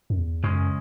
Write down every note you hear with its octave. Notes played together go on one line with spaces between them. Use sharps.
F#2
E2
F#2 C#3 G#3 C#4